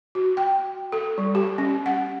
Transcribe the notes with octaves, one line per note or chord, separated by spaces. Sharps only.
F#4
G5
A4
G3
G4
C#4
F#5